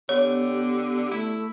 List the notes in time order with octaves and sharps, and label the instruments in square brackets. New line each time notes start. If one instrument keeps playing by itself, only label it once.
[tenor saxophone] D3 [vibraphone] B3 [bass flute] G4 [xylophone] C#5
[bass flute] A3 [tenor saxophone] E4